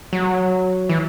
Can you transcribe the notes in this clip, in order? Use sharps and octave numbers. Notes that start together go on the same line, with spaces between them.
F#3
E3